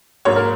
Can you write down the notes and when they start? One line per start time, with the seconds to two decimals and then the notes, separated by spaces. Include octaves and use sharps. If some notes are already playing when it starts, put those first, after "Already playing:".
0.25 G#2 F#3 A#3 C#5
0.36 A#4